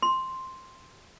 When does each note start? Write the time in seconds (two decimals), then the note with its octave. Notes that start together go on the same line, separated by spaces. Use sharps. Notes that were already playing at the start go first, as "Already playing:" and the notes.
0.02 C6